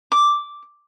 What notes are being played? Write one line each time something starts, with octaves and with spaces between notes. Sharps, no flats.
D6